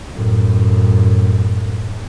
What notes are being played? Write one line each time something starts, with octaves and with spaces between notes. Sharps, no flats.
F#2 A2